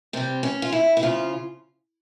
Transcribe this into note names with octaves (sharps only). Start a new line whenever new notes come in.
C3 G3 C4
C#4
F4
E4
E4
C#3 F3 F4